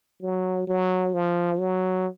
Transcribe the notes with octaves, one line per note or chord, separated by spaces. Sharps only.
F#3
F#3
F3
F#3